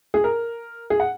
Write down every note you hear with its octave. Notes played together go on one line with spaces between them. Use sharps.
G#4
A#4
G#4
F#5